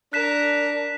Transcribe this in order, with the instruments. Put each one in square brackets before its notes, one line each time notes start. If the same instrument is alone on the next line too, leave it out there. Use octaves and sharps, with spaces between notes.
[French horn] D4 [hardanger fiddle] A#4 [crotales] F#6 B6 E7